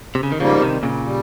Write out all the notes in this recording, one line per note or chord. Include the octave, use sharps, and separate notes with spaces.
C3
C#3
D#3
G#2 C#3 F3 G3 A#3
F3
C3 D#3
A#2 C#3
G3